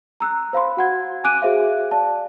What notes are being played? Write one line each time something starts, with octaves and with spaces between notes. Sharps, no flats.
A#5 E6 F#6
C5 F5 B5 C6
F#4 F#5 G#6
G#5 D6 F#6 D7 D#7
F#4 G#4 C5 E5 F5
D5 F5 A5